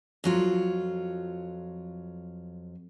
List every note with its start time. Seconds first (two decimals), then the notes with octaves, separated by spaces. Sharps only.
0.24 F2 F#3 F4